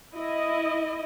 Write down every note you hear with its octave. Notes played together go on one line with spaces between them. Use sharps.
E4 D#5